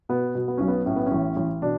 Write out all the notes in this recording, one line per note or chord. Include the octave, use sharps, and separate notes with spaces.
B2 B3
B2
B3
B1 C#4
B3
A2 C#4
B3
C#4
A1
A1
B2 D4